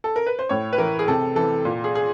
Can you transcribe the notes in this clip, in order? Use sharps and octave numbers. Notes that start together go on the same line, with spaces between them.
A4
A#4
B4
C5
A2 C#5
B4
E3 A#4
G#4
C3 A4
E3 A4
A#2
G#4
G#4